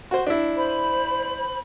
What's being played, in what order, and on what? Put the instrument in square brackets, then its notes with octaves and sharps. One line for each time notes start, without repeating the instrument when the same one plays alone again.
[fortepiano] F#4 C5
D4 E4
[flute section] C5 B5